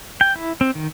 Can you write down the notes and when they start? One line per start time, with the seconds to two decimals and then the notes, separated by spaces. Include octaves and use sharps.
0.21 G5
0.36 E4
0.61 C4
0.75 D#3